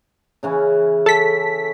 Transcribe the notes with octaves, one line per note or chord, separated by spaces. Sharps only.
C#3 E3 C#4
A4 B6